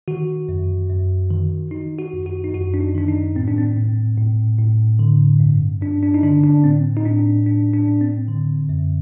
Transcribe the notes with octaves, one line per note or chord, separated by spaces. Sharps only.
D#3 F#4
F#2
F#2
D#3
D#3 D#4
F#4
F#2
F#4
D#4
F#2 F#4
D4
D#4
D#3 D4
D#4
A2 C4
D4
C4
A2
A2
A2
D3
G2
G2 D4
D4
D#4
D3 D4
D4
A2 C4
D#4
A2 D4
A2 D4
D4
A2
C4
D3
F#2